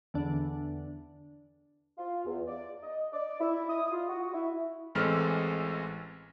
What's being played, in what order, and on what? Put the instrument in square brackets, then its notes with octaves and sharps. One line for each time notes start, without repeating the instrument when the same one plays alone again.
[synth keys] E2 D3 D4
[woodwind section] F4
E2
D5
D#5
D5
E4
D#6
F4
F#4
E4
[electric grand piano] A1 E3 G#3 C4 A4 F6